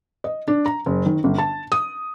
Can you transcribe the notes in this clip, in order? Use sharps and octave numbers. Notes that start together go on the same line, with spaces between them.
D#5
D4
A#5
F#1
D#3
G1
A5
D#6